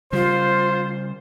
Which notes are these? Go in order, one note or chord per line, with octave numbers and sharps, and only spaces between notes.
C#3 G3 F4 C5